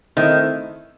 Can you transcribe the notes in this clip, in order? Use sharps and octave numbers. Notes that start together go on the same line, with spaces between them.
D#3 A3 C4 E4